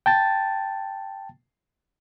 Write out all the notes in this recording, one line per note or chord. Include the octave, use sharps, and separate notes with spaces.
G5 A5 A6